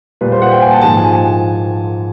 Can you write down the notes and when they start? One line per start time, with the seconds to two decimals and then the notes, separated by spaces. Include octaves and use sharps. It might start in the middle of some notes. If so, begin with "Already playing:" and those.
0.21 A#2 G3 B4
0.32 C5
0.42 F#5
0.52 G5
0.61 G#5
0.71 A5
0.81 G#2 F3 A5
0.97 G#5